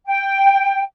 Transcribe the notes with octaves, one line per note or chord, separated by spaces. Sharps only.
G5